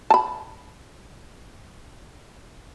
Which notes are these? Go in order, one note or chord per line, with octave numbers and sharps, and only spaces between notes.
A5 B5